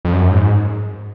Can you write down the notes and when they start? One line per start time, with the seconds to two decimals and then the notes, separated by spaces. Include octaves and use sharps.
0.05 F2
0.13 F#2
0.32 G#2